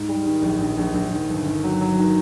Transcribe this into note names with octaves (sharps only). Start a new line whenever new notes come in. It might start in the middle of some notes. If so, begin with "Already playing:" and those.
Already playing: G#2
G3
D#3
A#1
A#1
A#1
A#1
D#3
G1
D#3
F#3
F#3
D#3